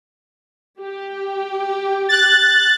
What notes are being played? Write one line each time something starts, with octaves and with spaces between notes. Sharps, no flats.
G4
F#6 A6